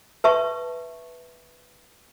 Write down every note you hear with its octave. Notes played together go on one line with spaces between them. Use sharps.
B4 E5 A5 C#6